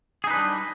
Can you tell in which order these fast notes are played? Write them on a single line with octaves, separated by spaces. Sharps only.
G#4 D#4 B4 D4 G3